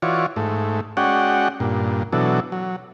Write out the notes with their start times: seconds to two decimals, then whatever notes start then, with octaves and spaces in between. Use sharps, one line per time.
0.02 E3 F4 F#4 C#5 D5
0.36 G#2 A3
0.97 G#3 C#4 F#4 D5 F#5 G5
1.60 G2 A#2
2.13 B2 E3 F#3 D4 A4
2.52 F#3